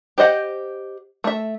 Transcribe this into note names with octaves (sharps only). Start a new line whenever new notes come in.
G4 C5 D#5 F#5
A3 E5